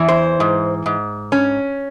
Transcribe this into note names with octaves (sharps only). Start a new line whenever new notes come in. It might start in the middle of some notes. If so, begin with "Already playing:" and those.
Already playing: E2 E3
C5
G#2
G#2
C#4